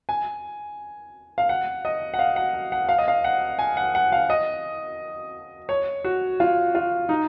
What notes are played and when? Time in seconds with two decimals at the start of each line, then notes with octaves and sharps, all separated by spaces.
0.09 G#5
1.38 F5
1.49 F#5
1.85 D#5
2.14 F#5
2.19 F5
2.36 F#5
2.72 F#5
2.89 F5
2.98 D#5
3.08 F5
3.24 F#5
3.59 G#5
3.77 F#5
3.95 F#5
4.12 F5
4.30 D#5
5.69 C#5
6.04 F#4
6.40 F4
6.75 F4
7.09 D#4